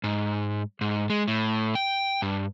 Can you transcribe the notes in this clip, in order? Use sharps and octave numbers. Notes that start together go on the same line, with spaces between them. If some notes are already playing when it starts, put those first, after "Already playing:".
G#2
G#2
G#3
A2
G5
G2